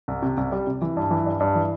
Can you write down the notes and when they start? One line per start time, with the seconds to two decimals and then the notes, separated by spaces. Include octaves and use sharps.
0.08 C2
0.22 C3
0.37 C2
0.52 G3
0.67 C3
0.82 E3
0.97 G2
1.11 E3
1.26 G2
1.40 G2
1.55 E3